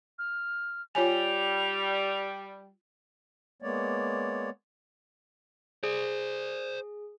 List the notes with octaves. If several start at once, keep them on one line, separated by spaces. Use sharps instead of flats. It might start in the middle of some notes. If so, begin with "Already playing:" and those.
F6
G3 F4 C#5 G#5 F7
G#3 A#3 B3 C#5 D5
G#4 C5 D5